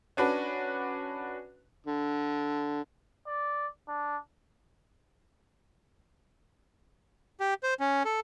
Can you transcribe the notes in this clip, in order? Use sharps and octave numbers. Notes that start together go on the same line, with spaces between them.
C#4 D4 F#4 B4
D3
D5
D4
G4
C5
C#4
A4